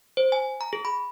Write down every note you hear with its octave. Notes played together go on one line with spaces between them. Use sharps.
C5
G#5
A#5
G#4
B5